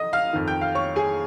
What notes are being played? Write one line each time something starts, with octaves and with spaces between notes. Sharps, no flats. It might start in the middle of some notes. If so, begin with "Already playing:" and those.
Already playing: D#5 D#6
F5 F6
F2 D#3
G5 G6
F5 F6
C#5 C#6
G#4 G#5